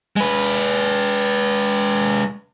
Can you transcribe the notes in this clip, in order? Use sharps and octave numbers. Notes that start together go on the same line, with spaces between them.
G#3 B4